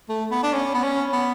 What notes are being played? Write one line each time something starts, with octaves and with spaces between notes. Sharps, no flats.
A3
B3
D4
C#4
B3
C#4
B3